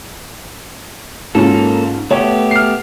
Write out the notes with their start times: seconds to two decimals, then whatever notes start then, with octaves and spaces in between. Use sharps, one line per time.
1.35 G#2 A#3 C#4 F4 A4
2.11 A3 B3 G4 C#5
2.51 F6 C7